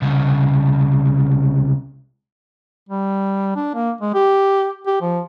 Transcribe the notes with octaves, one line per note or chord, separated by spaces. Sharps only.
C2 C#3
G3
D4
A#3
G#3
G4
G4
F3